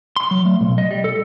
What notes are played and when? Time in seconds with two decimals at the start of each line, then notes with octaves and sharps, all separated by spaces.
0.16 C6
0.31 F#3
0.45 A3
0.61 B1
0.78 D#5
0.91 G3
1.04 A4